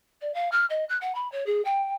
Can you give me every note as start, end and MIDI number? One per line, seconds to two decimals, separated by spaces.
0.21 0.34 74
0.34 0.49 77
0.52 0.65 89
0.70 0.85 75
0.89 0.97 90
1.01 1.15 78
1.15 1.30 83
1.32 1.44 73
1.46 1.64 68
1.65 1.94 79